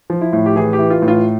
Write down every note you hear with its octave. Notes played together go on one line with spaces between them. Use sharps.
F3
E4
A2
G4
E3 G#4
G4
E3
F4
A2
F4